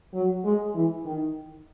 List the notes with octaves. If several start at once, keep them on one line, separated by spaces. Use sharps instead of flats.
F#3
G#3
E3
D#3